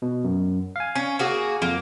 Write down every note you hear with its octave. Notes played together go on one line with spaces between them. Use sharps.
B2
F#2
F5 G#5
C#4
A#3 F#4 G#4
F2 A#3